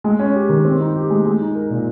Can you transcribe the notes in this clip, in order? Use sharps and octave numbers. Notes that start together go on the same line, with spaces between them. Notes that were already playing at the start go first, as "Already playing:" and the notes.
G#3
C#4
G4
D#3
C4
D#4
G4
G#3
G#3
D#4
A#4
A#2